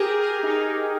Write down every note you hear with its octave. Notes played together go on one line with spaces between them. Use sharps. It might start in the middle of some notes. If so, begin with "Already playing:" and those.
Already playing: G4 G#4 A#4
A#4
D#4